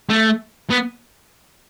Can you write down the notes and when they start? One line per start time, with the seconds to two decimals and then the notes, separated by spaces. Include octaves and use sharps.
0.10 A3
0.70 B3